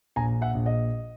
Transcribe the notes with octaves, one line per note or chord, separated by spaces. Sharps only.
A#1 G#5 A#5
E5 F#5
A#1
D#5